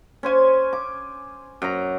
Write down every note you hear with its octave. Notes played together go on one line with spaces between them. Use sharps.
C#4 C5 G#5
D6
F#2 A#5